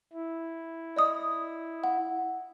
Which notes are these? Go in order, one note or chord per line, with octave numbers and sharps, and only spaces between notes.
E4
D5 D#5 D#6
F#5